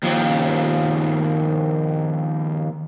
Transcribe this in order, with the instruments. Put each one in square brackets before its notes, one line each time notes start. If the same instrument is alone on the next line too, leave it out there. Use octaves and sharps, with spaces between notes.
[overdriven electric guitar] D#2 F3